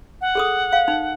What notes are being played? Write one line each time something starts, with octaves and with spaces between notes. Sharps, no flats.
F#5
G#4 A4 D#6
F5
D#4